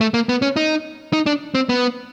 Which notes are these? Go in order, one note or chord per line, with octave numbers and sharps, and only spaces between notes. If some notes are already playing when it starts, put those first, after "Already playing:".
A3
A#3
B3
C#4
D#4
D#4
D4
C4
B3